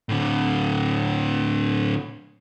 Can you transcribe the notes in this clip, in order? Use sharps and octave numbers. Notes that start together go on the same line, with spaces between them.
A2 D3